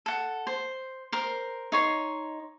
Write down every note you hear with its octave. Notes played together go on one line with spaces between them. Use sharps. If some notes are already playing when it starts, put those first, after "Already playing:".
A4 F#5
C5
A#4 C5
D#4 C#5 C6